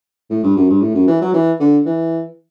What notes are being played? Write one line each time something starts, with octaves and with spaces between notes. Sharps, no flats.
A2
G2
F#2
G2
A2
F#2
E3
F#3
E3
D3
E3